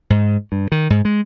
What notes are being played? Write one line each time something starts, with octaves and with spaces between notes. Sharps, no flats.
G#2
G2
D#3
G#2
G#3